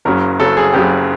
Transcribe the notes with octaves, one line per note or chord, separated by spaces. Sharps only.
F#1 F#2 C#3 F#3 A#4
F#1 F#2 C#3 F#3 A4
G#4
F#1 F#2 C#3 F#3 G4